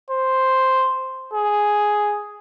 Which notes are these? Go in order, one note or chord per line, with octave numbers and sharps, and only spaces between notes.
C5
G#4